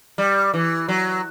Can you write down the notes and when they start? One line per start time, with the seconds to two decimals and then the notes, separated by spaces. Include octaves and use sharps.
0.18 G3
0.54 E3
0.89 F#3